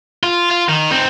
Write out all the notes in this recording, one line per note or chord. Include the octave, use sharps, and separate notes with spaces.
F4
F4
D#3
C4 D#4